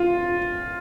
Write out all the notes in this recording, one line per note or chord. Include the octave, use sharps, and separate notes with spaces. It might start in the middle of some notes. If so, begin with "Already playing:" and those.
Already playing: F4